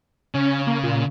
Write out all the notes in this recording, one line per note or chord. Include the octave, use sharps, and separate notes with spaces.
C#3 C#4
A#3
A#2